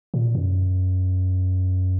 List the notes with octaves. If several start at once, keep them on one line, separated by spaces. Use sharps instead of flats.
A#2
F#2